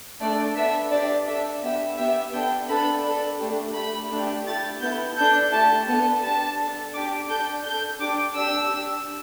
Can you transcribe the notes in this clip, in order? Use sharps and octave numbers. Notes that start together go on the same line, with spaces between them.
A3 D4 A4 D5
B3 D4 A4 E5
D4 G4 D5
D4 A4 E5
B3 G4 E5
B3 G4 E5
B3 D4 A4 G5
B3 D4 A4 B5
D4 A4
A3 D4 G4
A3 G4 B5
A3 D4 G4
A3 E4 G4 A6
B3 E4 A4 G6
D4 A4 G6
A3 E4 G4 A5
B3 D4 A4 A5
D4 G4 A5
D4 A4
D4 G4 D6
D4 A4 G6
D4 A4 G6
D4 G4 D6
D4 G4 E6
D4 G4